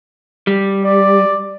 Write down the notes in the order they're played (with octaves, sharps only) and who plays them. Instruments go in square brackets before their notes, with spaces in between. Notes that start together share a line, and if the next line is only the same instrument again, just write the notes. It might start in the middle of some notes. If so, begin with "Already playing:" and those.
[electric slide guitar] G3
[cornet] D5